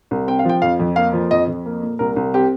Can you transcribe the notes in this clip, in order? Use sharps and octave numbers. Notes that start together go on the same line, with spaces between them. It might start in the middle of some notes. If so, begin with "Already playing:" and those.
C2
C4 G5
F5
F3 G5
F2 F5
F2
A#3 F5
F3
F2 D#5
F2
A#3
A#2
C2 A#4
C2
C4 G4